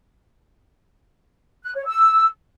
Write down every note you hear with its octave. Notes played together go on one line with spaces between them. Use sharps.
F#6
C#5
E6